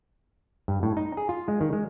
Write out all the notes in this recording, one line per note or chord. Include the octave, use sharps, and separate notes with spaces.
G2
A2
D#4
G#4
F4
G#3
D#3
G#3